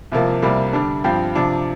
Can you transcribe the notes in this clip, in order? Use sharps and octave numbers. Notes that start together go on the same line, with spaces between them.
C2 C3 F3 A#3
C2 C3 G3 A#3
D3 G3 D4
G2 F3 C4 G4
C3 F3 D4